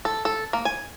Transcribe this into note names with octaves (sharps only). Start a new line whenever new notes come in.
A4
A4
A#3
G#5